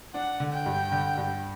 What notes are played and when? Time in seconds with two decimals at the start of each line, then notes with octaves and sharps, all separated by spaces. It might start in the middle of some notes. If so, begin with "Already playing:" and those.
0.14 D4 F#5
0.40 D3
0.53 G5
0.66 G2
0.92 D3
1.17 G2